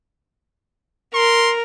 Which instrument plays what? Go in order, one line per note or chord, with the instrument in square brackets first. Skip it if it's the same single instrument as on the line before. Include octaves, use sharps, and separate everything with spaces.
[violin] A#4 [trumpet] C6